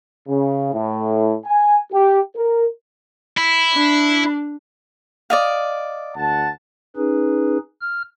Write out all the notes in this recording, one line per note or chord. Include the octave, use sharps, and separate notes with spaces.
C#3
A2
G#5
G4
A#4
E4
D4
D5 D#5 F5
D2 F#5 A5
C#4 D#4 G#4 B4
F6